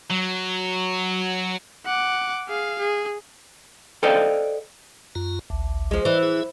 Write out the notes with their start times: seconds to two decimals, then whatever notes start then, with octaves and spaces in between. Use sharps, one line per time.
0.11 F#3
1.86 F#5 D6
2.48 G#4 F5
2.79 G#4
4.03 A4 C5 D5 D#5 F5 G5
5.15 F#2 F4 A#5
5.50 A1 D2
5.91 F3 G#3
6.05 E3 C5 D5 D#5
6.23 G#4 E5